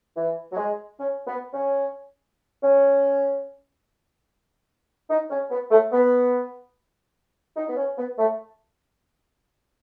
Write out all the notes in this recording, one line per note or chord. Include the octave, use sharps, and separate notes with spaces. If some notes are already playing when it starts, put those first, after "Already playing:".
E3
F#3
G#3
C#4
B3
C#4
C#4
D#4
C#4
B3
A3
B3
D#4
B3
C#4
B3
A3